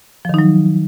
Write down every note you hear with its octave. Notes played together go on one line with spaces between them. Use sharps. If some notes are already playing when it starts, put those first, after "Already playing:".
D#3 F3 F#3 D#4